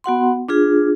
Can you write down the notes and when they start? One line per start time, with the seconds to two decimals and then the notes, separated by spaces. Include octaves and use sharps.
0.04 B3 F#4 F#5 C6
0.49 D4 F4 G#4